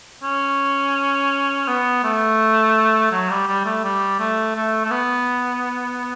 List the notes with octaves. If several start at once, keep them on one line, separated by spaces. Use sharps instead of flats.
C#4
B3
A3
F#3
G3
G3
A3
G3
A3
A3
A3
B3